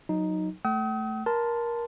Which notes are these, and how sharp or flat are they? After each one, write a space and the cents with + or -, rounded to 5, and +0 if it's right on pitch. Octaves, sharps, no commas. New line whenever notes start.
F#3 -15 D#4 +0
A3 +0 G5 -45 D#6 +40
A#4 +15 A5 +0 C6 -20